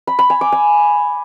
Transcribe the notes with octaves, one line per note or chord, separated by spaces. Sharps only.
B5
B5
G#5
D6
G#5